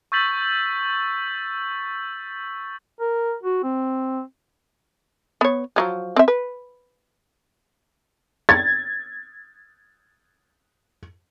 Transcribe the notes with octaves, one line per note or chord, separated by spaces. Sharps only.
C#6 E6 G6 A6 B6 F#7
A#4
F#4
C4
B3 C#5
F3 F#3 G#3
C4 E5
B4
G#6 A6